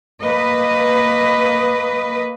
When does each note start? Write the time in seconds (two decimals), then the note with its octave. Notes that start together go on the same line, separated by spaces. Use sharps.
0.23 A#3 B4 D#5